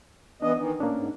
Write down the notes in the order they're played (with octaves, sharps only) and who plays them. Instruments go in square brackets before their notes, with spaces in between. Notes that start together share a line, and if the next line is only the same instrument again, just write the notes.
[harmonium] E3 B3 D#5 [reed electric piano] D4
[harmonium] D#3 E3
[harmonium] A2 [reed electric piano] A#3 C#4 D4
[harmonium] G#2